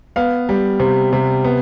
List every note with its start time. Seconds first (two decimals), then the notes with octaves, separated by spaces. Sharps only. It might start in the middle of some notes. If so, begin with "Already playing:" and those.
0.16 B3 F5
0.49 G3
0.80 C3
1.13 C3
1.44 B3